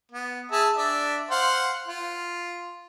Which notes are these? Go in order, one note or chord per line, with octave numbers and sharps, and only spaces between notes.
B3
G#4 E5 A5
D4 D5 E5
C5 F5 F#5
F4